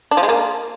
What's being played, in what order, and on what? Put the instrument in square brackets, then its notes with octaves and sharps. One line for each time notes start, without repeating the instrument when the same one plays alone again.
[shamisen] D4
F3
G#3
A#3